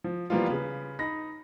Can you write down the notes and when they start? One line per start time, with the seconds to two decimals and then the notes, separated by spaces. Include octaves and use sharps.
0.04 F3
0.30 E3 F3 G3 A#3 B3 F4
0.46 C#3 B4
0.99 D#4 B5 A#6